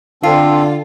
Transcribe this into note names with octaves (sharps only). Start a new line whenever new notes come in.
D3 C4 D4 F4 A4